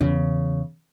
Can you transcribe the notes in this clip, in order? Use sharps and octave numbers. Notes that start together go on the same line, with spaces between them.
E2 C#3